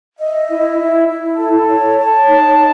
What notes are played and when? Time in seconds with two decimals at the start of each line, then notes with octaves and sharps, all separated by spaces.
0.18 D#5 E5
0.49 E4
0.78 E4
1.08 E4
1.38 A4 A5
1.68 C#5
1.98 C#5 A5
2.28 D#4